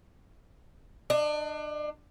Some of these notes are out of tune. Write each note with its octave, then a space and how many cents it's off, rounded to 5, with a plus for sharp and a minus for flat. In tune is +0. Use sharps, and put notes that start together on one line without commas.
D4 +30 D#5 +0